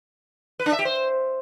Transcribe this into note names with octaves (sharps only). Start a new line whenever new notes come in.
B4
D4
E5
G4
C5